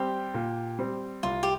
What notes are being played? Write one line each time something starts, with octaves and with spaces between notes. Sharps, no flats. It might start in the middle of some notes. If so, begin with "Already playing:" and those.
Already playing: G3 C4 G4
A#2
G3 C4
C2 F4
G4